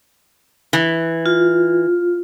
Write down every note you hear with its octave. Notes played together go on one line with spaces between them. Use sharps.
E3
F4